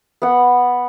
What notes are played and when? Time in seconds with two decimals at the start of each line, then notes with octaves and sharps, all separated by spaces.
0.22 B3 F#5